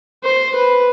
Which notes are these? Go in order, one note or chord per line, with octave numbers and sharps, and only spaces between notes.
C5
B4